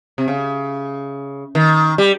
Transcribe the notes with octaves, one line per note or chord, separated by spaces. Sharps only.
C3
C#3
D#3
G3